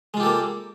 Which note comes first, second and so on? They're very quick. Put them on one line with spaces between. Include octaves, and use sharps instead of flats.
G#3 F4 G4 A4 A#3